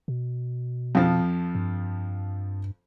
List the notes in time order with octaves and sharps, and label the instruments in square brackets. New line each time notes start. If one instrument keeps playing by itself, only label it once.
[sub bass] B2
[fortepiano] F2 F3
[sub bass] G2